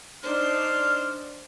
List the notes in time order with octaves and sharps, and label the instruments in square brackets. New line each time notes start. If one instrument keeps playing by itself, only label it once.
[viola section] D4 D#4 [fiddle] C5 [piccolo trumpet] F6